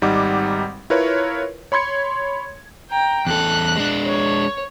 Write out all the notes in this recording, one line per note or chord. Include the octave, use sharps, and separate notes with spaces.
G#1 G3 D#4 F#5 D6
E4 F4 A#4 B4 C#5
C#5 B5 C6 G#6 C#7
G5 A#5
E2 A4 F#6
G#3 D4
C#5